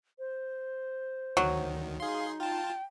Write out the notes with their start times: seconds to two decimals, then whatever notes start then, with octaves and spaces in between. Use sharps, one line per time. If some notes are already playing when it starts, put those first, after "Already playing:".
0.19 C5
1.37 D2 D#3 F#3
2.00 D#4 G#4 F5 C6
2.40 F4 G5 A5